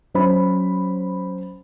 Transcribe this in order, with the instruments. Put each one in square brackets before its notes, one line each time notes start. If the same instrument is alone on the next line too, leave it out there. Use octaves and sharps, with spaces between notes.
[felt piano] F#3 C#4 C5 B5